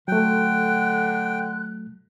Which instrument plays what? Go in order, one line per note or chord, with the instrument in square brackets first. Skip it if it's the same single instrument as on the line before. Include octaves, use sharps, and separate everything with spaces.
[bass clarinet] D3 [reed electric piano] F#3 A3 [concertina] G5 [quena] F#6